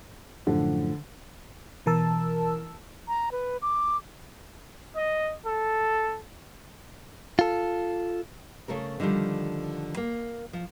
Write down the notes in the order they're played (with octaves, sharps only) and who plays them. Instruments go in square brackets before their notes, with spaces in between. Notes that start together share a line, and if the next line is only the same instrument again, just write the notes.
[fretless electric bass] F#2 A2 F3 [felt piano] D3
[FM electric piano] B2 E3 A#4 A5 E6
[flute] A#5
B4
D6
[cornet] D#5
A4
[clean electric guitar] F4 A4
[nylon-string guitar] C#3 A3 A4 A#4
D3 D#3 F3 G3
A#3
F3